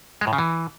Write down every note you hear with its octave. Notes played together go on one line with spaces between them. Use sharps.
G#3
A2
C#3
E3